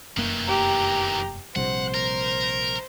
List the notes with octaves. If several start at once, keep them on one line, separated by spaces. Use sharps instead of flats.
F1 F#2 D#3 E3 A#3
G4 A#5
A#1 C3 G3 C5 F#5
A#4